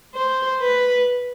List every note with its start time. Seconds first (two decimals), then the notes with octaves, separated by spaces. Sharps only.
0.14 C5
0.61 B4